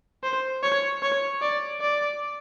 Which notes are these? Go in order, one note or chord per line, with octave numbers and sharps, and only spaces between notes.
C5
C#5
C#5
D5
D5